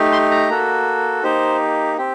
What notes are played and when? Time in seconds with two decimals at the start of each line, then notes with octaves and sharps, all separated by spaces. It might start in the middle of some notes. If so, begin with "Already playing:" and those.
Already playing: A3 D#4 G4
0.12 C6
0.31 A#5
0.49 A#3 F#4 A4
1.23 A#3 D#4 G4 C5
1.97 C4 G4